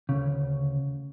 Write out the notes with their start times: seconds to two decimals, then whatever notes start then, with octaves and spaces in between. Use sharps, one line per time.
0.09 D2 C#3